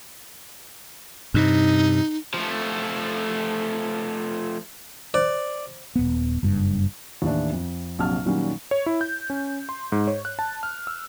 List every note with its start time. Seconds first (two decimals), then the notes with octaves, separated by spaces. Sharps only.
1.34 G2 C3 D#4
2.34 F3 A3
5.14 C5 D5
5.96 D#1 B3
6.43 F#1 G2
7.22 D#2 A2 E3 D4
7.53 F2
7.99 A#1 C3 F#3 A5 F6
8.25 A#2 D#3 F#3 G3 C#4
8.71 C#5
8.86 E4
9.01 G6
9.30 C#4
9.69 C6
9.92 G#2
10.07 C#5
10.25 F#6
10.39 A5
10.63 F6
10.87 E6